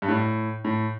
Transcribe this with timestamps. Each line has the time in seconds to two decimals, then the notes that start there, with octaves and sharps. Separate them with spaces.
0.02 G2
0.08 A2
0.64 A2